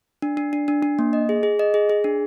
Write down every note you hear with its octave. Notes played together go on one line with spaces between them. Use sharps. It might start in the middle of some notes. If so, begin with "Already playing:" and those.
D4
D4
D4
D4
D4
A#3
D#5
G#4
G#4
D#5
G#4
G#4
D4